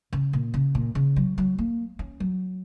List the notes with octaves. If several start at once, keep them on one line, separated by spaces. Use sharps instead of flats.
C#3
A#2
C#3
A#2
C#3
F#3
F#3
A#3
C#4
F#3